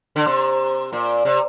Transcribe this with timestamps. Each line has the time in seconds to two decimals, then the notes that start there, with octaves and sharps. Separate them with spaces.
0.16 D3
0.27 C3
0.93 A#2
1.25 C3